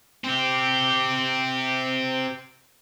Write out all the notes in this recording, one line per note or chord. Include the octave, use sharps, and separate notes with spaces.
C4 G4